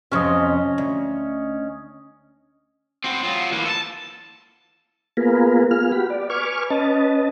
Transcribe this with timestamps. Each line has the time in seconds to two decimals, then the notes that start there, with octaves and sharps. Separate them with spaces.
0.12 F2 C3 C#4 D#5
0.78 D2
3.04 C4 F#4
3.23 F#3 F4
3.52 E3 A#3
3.66 A4 A5
5.17 A#3 B3 F4 G#4 A#4 B4
5.71 B3 F4 G#4 F6
5.92 F#4 G4 B5
6.10 D5
6.30 B4 G#5 C#6 D6 F6
6.70 C#4 B4 D#5 A5